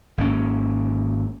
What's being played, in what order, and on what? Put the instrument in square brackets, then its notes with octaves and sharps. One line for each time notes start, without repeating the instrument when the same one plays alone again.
[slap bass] G#1 A#3 C#4